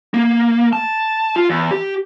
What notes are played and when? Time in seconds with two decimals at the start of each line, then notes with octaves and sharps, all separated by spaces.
0.14 A#3
0.73 A5
1.36 F4
1.50 E2
1.71 G4